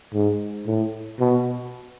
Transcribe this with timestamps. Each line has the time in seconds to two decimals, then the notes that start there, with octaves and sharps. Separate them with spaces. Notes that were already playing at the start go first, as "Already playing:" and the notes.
0.14 G#2
0.67 A2
1.20 B2